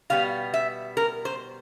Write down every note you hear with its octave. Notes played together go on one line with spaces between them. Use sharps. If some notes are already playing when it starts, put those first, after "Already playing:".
B2 G3 B3 F5
E5
A#4
C5